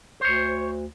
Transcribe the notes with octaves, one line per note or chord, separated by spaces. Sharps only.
D2 C5 C#5